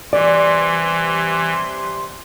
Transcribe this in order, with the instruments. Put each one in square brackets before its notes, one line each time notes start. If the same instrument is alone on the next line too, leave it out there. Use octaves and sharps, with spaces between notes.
[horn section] C3 G3 C6 [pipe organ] E3 [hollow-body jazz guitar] D5